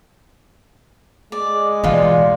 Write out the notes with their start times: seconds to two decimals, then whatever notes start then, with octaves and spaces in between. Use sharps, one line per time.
1.32 G#3 D5
1.84 B2 E3 B3 D#4 F4 D5